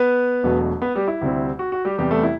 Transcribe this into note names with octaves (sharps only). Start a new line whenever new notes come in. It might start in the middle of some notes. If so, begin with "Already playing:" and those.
Already playing: B3 B4
E1 E2 B2 F#3 A3
B3 B4
G3 G4
E4
D2 C3 G3 C4
F#4
F#4
G3 G4
E2 C3 G3 B3 G4
A3 A4
E4